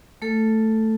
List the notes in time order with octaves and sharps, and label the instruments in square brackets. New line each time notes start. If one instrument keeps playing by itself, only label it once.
[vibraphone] A3 A4